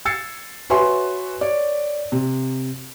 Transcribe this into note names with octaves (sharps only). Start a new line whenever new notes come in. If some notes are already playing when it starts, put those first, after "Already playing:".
E6 G#6 A6 C7 C#7
F#4 B4 C#5 E5 G#5 C6
C#5 D5
C3